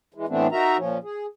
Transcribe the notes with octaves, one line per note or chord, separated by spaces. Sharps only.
E3 G#3
A2 E3 A3 B3 C4 D4
D#4 F#4 A#4 E5 A#5
A#2 F3 C#4
G#4